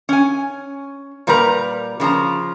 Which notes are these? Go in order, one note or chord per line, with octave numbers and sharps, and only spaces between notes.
C#4 G#5
A#2 G3 A#4 B4 A#5
C#3 F3 F#4 A#5